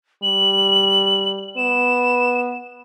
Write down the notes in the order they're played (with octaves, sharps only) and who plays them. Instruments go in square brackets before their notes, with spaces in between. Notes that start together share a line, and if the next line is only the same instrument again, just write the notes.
[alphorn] G3 [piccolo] F#7
[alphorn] B3 [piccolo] E7